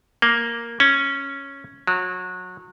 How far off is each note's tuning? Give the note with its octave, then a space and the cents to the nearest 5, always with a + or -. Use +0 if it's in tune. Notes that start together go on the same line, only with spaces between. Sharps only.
A#3 +0
C#4 -5
F#3 -25